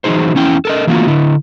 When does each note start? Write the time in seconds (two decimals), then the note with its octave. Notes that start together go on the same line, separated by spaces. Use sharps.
0.04 E3 F#3 G3 D#4 G#4 C5
0.35 E2 C#4 E4 G5
0.65 A4 A#4 D#5
0.87 E3 F#3 A3 A#3 F4 F#4
1.07 D3 E4